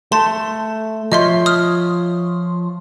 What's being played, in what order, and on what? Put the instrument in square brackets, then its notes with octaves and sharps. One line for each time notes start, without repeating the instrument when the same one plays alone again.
[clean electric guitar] A3 [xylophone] A5 C6
[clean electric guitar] F3 F4 C#5 [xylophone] D#5 E5 C6
[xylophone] D#6 F6